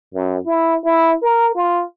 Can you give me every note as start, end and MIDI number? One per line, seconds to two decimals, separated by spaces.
0.14 0.39 42
0.46 0.78 64
0.84 1.16 64
1.22 1.53 70
1.56 1.83 65